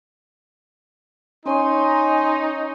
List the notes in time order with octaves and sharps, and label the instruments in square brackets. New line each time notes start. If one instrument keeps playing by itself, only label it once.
[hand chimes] C#4 C#5 C#6 [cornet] D#4 [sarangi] G#5 [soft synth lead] C6